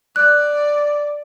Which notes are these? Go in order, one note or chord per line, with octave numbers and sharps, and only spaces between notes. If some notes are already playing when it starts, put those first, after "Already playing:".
D5 F#6